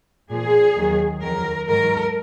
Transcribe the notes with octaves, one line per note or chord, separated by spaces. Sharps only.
A#2 F3 G#4
D#2 D#3 F#3
F2 D#3 F#3 A#4
G#2 D#3 F#3 A#4